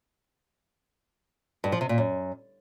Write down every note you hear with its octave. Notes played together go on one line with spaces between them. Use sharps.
G2
F3
C3
A#2
F#2